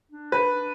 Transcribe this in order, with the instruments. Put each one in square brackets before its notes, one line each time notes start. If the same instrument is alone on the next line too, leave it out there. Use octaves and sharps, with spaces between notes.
[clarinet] D4
[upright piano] B4